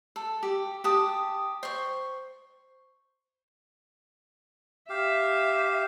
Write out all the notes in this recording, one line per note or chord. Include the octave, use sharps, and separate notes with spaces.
A4
G4
G4 A5 D#6
C5 C#6
G4 E5 F5